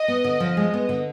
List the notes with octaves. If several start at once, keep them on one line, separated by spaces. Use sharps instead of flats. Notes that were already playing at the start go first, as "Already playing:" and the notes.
Already playing: D#5
B3
D3
F3
G#3
B3
D3